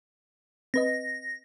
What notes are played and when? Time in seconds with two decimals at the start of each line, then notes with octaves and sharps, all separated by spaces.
0.74 C4 B4 D#5 A#6